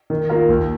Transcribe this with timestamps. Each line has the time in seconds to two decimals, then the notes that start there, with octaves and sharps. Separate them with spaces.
0.10 D#3
0.29 A#3 F4 A#4
0.49 D#2